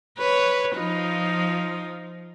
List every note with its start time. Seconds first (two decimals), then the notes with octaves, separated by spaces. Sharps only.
0.18 B4 C#5
0.76 F3 D#4 F4